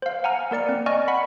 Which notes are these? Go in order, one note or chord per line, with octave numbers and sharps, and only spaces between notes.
C5 F5
F#5 G#5 A#5 F6
A#3 A#4 D5 C#7
C4
D5 D#5 G#5 C#6 F6
F#5 B5 B6